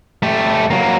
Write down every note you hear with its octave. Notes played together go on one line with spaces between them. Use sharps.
A3 G4
F#3 A#3